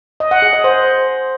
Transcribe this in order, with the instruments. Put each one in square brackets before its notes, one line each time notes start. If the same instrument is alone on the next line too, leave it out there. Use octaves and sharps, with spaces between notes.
[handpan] D#5
F#5
G#4
D#5
C5